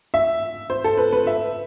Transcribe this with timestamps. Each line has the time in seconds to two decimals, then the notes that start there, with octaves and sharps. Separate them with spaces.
0.14 E5
0.70 C5
0.84 A4
0.98 B4
1.13 B4
1.27 E5